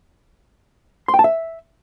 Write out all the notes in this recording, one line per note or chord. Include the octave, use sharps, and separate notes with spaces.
C6
G5
A5
E5